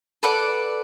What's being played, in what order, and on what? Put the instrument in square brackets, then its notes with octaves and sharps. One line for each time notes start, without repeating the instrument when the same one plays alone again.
[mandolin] A4 B4 D5 F#5